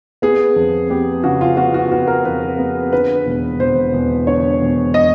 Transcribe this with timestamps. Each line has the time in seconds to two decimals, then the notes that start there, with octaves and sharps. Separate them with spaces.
0.22 B3 G#4
0.56 F2
0.90 B3 G4
1.24 C#3 F#4
1.41 F4
1.57 B3 F#4
1.74 F#4
1.91 B3 F#4
2.07 A#4
2.25 F2 B4
2.59 B3
2.93 D3 B4
3.26 E1
3.60 E1 C5
3.93 E1
4.27 D3 C#5
4.61 E1
4.94 D#5